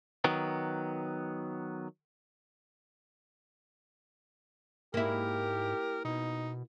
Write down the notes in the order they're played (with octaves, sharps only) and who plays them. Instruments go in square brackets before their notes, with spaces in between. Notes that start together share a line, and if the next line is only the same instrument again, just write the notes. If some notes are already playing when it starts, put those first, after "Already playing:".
[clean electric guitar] D#3 F#3 B3
[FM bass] G#2 [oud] A#3 E4 [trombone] G4 [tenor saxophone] A#4
[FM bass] B2 [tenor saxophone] D#4